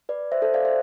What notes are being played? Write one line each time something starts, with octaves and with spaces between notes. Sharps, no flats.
B4 D5
C5 E5
A4 C5
D5 F5
C5 E5